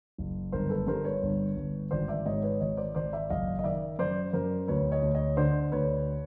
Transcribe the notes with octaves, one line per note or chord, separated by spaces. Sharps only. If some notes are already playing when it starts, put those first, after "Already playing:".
F#1
G1 A#4 C5
A4 B4
G2 A#4 C5
B4 C#5
G1
G1
G#1 C5 D5
D5 E5
G#2 C#5 D#5
B4 C#5
G#1 C#5 D#5
C5 D5
G#1 C5 D5
D5 E5
F#1 D#5 F5
D#5
D#3 D5 E5
F#2 C5 D5
F#2 A#4 C5
D2 B4 C#5
C#5 D#5
D2
C#5 D#5
D3 C5 D5
D2 B4 C#5